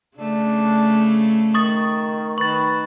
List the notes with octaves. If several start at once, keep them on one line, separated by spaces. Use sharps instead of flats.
C#3 A3 D4
D#3 C#6 D#6 A6
D#3 B4 C#6 A6